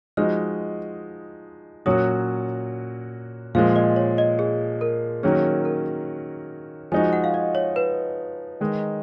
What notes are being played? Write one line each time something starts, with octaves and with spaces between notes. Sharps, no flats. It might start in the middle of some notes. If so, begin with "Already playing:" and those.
F3 G#3 D#4 F#4 F6
A#2 F#3 C#4 F#4 D#6
A#2 F3 G#3 F5
D#5
C#5
D#5
G#4
A#4
D#3 F#3 A#3 C#4 G#4
A#4
F3 G#3 D#4 F#4 G#5
F#5
F5
D#5
C#5
B4
D#3 G#3 D#4